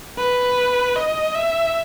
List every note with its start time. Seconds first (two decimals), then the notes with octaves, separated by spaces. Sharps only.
0.18 B4
0.96 D#5
1.35 E5